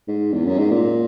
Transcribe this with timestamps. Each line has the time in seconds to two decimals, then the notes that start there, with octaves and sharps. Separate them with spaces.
0.08 G#2
0.33 E2
0.46 F#2
0.58 G#2
0.71 A#2